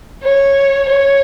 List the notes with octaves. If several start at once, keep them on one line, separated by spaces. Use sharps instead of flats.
C#5
C#5